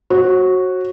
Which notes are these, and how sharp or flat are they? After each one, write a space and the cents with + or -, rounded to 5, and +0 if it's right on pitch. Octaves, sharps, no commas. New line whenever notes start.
F#4 +0 C#5 -45